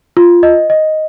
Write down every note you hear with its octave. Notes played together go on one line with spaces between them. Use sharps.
F4
D#5
D#5